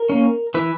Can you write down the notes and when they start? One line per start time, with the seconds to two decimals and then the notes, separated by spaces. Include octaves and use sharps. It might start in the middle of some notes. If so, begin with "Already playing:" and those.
Already playing: A#4
0.10 A#3 C#4
0.54 E3 B4